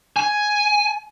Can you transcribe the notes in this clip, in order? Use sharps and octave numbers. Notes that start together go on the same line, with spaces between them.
G#5